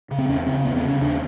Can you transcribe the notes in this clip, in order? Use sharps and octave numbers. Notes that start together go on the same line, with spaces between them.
C#3
C4
E2 C#4
C#3 C4
E2 B3
C4
C#3
C#4
D#2 D4